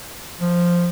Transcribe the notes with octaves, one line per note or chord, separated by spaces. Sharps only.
F3